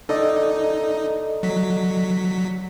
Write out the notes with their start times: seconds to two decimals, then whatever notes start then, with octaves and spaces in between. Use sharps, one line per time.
0.09 D#4 A4 D5 D#5
1.43 F#3 B6